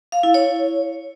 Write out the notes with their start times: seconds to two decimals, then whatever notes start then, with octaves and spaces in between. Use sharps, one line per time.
0.12 F5
0.23 E4
0.34 C#5